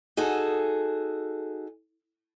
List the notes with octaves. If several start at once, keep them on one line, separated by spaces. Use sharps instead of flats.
D#4 F#4 G#4 A4